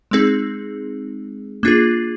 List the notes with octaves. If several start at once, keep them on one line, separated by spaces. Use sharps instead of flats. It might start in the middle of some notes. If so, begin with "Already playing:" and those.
G#3 C4 D#4 G#4
A#3 D4 F4 G#4